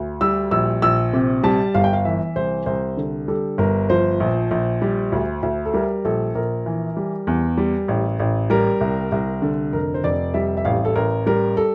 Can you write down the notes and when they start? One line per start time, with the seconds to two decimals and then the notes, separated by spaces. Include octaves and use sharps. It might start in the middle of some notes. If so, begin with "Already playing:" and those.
Already playing: D2
0.21 G3 E6
0.51 A#1 E6
0.82 A#1 E6
1.13 C3
1.43 G3 A5
1.75 G1 F5
1.84 G5
1.93 F5
2.05 E3 E5
2.36 C2 C5
2.66 C2 C5
2.97 D3
3.28 G3 A4
3.58 G1 A#4
3.90 F3 C5
4.20 A#1
4.51 A#1
4.82 G3
5.12 D2
5.43 D2
5.65 A4
5.74 G3 A#4
6.05 A#1 A4
6.35 A#1 A#4
6.66 E3
6.97 G3
7.27 E2
7.57 G3
7.88 A1
8.20 A1
8.50 G3 A#4
8.81 C2
9.12 C2
9.42 D3
9.73 F1 A#4
9.94 C5
10.04 F1 D5
10.34 G3 E5
10.57 E5
10.65 A1 F5
10.85 A4
10.95 A1 A#4
11.26 G3 A#4
11.57 A4